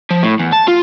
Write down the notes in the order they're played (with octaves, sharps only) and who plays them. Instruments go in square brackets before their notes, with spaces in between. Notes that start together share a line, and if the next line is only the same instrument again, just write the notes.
[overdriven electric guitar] F3
A2
E2
A5
F4